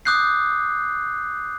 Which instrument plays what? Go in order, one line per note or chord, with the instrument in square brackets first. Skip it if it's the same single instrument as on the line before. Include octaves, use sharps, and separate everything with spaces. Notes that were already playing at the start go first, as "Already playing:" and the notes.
[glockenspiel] D6 D#6 F#6 G6 C7